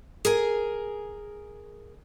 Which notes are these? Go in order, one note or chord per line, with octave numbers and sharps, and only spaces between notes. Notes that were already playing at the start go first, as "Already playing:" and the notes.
G#4 A#4 G#5